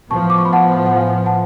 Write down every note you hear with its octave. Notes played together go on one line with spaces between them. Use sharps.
A2 F3 B3 A5 C#6
D6
C#6
B5
F#5 A5
F#5
F5 G#5
F#5 A5